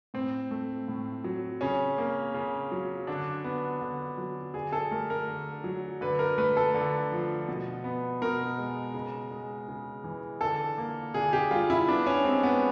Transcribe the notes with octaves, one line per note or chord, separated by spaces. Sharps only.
A2 C4
A3
A2
F#3
C#3 C#4
A#3
C#3
F#3
D3 D4
B3
D3
F#3
D3 G#4
A4
A3 A#4
A#4
D3
F#3
D3 B4
A#4
A3 B4
A4
D3
F3
B2
B3
B2 A#4
G#3
C#3
G#3
C#3
E3
D3 A4
A#3
D3 G#4
G4
G3 F4
E4
B3 D4
C#4
G#3 C4
B3